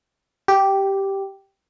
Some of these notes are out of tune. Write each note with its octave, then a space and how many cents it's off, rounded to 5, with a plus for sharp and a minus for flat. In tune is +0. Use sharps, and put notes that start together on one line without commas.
G4 -5